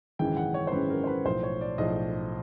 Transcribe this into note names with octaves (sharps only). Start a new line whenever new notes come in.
G#1 F#2 C#3 E3 G5
F#5
C#5
C5
G#1 F#2 C#3 E3 B4
A#4
C5
B4
B1 A2 F3 C5
C#5
D5
B1 A2 F3 D#5